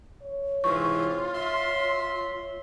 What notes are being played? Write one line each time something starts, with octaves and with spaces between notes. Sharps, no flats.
C#5
G#2 C3 E3 F4 C#6
E5 C6